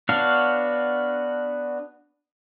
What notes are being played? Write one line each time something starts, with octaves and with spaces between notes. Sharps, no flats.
B3 D4 F#4 C#5 F5